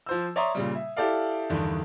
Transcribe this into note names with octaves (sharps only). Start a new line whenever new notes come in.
F3 C5 E6
C#5 D5 E5 A#5 C6 D#6
A#2 C#3 G3
E5
E4 G4 A4 D5 F5
E2 G2 D3 D#3